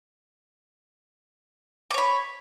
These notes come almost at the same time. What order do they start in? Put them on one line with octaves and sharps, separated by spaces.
D6 C#5 B5